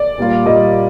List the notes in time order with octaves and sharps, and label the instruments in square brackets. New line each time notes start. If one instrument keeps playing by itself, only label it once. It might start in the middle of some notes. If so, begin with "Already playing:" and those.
Already playing: [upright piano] D5
[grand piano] A#2 G3 A#3 F4
[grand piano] A#2 G3 A#3 F4 [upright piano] D#5